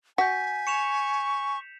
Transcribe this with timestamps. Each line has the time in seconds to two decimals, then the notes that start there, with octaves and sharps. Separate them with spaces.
0.18 F#4 G#5 G6 B6
0.67 C#6 C#7 E7 F7